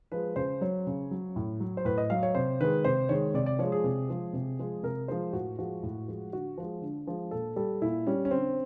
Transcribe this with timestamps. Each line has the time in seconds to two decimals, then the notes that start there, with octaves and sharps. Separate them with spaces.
0.12 F3 G#3 B4
0.36 C#3 C5
0.61 F#3 C#5
0.87 C#3
1.11 F#3
1.36 A2
1.60 F#3
1.77 C5
1.85 A2 B4
1.98 D#5
2.10 F#3 F5
2.23 C#5
2.35 C3 C5
2.60 D#3 G#3 B4
2.85 C3 C5
3.09 D#3 G#3 C#5
3.34 C3 D5
3.46 D5
3.59 F3 G#3 C#5
3.72 G#4
3.84 C3
4.09 F3 G#3
4.33 C3
4.59 F3 G#3
4.83 C3 A#4
5.08 F3 G#3 C5
5.33 A2 F#4
5.59 F3 G#3 F#4
5.83 A2
6.08 F3 G#3
6.33 D3 F#4
6.58 F3 G#3
6.82 D3
7.07 F3 G#3
7.31 A#2 A4
7.56 G3 A4
7.81 A#2 E4
8.07 G3 C#4
8.25 C#4
8.31 D3 C4